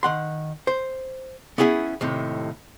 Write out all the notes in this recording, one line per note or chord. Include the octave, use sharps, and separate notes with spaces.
D#3 F#5 C6
C5
B3 C#4 E4 G#4 E5
D#2 A2 C3